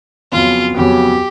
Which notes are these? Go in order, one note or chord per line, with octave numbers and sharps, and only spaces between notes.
F2 C#3 F#3 B3 F4
F2 C#3 F#3 B3 G4